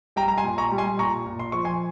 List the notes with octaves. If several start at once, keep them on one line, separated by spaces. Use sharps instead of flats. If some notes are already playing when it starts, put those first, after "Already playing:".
G3 G5 A#5
A#5
G#5 C6
A#2
A#5 C#6
G3
G#5 C6
A#2 A#5 C#6
A#2
C6
F3 C#6
G#5 C6